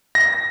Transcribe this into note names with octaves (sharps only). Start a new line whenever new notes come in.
A#6